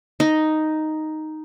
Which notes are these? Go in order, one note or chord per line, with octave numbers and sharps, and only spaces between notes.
D#4